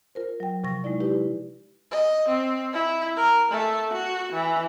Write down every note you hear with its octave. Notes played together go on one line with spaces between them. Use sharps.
F4 A#4 C5
F#3 G5
C3 F3 C#6 A#6
G#3 D#4 E4 D5
D#4 E4 G4 B4
D#5
C4
E4
A#4
A3
F#4
E3